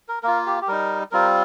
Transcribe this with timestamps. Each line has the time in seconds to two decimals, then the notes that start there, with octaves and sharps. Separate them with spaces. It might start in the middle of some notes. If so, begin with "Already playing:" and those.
0.09 A#4
0.23 A#3 F4 A#4
0.46 G4
0.62 G4
0.68 G3 D#4 A#4
1.12 G3 C4 F4 A#4